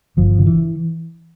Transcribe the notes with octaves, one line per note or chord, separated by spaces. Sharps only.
G1 F3
D3
E3